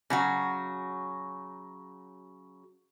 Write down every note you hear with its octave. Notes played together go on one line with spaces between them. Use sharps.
C#3 F#3 F#4